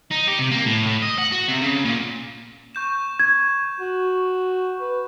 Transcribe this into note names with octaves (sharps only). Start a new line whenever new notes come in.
D#4
G4
C3
A#3
A2
A2
D#5
F#5
F#4
C3
C#3
A#2
C#6 G6 E7
G#6
F#4
B4